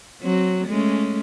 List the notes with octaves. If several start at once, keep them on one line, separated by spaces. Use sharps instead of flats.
F#3 C4
G#3 A3 C#4